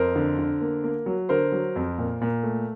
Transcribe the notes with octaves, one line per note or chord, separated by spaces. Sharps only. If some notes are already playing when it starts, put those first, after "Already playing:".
Already playing: F2 A#4 C5
D3
D3
A#3
A#3
F#3
D3 A#4 C5
F#3
F2
A#2
A#2
A3